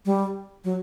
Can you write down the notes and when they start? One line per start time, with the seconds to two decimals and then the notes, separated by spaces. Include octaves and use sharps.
0.05 G3
0.64 F#3